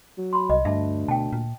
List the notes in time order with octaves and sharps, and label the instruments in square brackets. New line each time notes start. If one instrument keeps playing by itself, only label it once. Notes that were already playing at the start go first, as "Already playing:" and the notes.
[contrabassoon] F#3
[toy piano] B5 C6
[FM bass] C2 [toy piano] D#5
[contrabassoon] D2 [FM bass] G2 [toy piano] E5 A5
[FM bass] B2 [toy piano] G5 A5
[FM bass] A#2